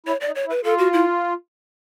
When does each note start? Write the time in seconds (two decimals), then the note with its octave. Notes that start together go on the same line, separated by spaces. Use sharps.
0.06 E4 C#5
0.21 D5
0.26 D#4
0.35 C#5
0.46 E4
0.50 B4
0.64 F4 A4
0.78 F#4
0.93 E4